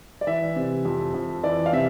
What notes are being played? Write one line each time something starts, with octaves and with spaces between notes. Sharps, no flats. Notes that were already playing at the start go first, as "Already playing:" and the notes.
D5
E3 E5
C3
F2
F2
E3 D5
F5
C3 E5